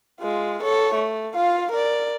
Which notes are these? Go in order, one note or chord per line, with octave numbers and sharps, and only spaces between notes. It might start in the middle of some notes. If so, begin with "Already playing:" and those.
G#3 F4
A4 C#5
A3
F4 F5
A#4 D5